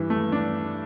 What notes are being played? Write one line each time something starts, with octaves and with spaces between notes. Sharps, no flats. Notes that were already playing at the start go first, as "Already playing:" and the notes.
Already playing: G2 E3
A3
D4